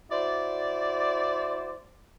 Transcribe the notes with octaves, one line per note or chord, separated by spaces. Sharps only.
E4 F#4 C5 D5